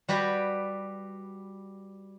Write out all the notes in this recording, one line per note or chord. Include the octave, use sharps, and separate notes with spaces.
G3 F#4 B4 D5 G5